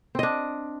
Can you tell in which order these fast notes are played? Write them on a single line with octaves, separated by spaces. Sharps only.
C4 D#5 D4